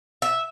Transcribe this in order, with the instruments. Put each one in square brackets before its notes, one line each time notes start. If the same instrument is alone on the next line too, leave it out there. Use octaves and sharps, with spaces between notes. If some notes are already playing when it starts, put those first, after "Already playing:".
[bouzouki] E5